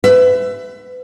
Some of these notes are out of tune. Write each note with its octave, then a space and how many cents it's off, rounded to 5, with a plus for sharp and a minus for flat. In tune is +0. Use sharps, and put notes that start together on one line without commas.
B4 +30 E5 +15